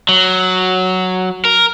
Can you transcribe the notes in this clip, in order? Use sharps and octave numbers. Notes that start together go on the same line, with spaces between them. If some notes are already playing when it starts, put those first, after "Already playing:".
F#3
A#4